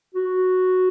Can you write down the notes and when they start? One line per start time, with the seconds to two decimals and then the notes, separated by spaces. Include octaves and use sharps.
0.14 F#4